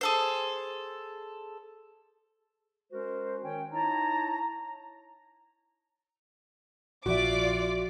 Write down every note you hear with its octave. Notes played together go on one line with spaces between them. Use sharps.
G#4 A4 C5
G#3 C#4 F#4 A#4 C5
D#3 C#4 C#5 G5
D#4 E4 C#5 A5 A#5
A#1 F3 F4 F#4 D5 E5 D6